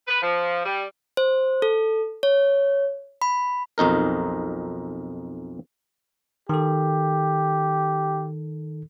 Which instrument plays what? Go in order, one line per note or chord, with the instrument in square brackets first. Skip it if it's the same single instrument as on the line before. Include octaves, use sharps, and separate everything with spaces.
[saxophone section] B4
F3
G3
[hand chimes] C5
A4
C#5
B5
[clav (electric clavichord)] B1 F2 D#4 A#4
[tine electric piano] D#3 A4 [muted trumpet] G4